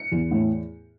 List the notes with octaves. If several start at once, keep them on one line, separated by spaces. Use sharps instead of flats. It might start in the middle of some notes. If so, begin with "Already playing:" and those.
Already playing: C#7
E2
A2